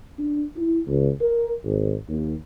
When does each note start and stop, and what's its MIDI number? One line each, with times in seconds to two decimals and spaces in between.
0.19 0.43 62
0.57 0.80 64
0.88 1.10 37
1.21 1.51 70
1.64 1.94 32
2.08 2.35 39